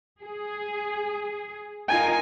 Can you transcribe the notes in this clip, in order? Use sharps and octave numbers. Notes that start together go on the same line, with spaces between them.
G#4
D#4 F4 A#4 G#5